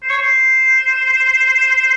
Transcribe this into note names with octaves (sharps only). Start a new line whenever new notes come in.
C5
C#5
C5